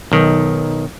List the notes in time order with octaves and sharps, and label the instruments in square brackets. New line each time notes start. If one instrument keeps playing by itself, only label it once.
[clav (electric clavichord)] B1 D#3